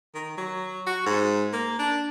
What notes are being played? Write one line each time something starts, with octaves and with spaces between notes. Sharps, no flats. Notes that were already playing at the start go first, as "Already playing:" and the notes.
D#3
F#3
F#4
G#2
A#3
D4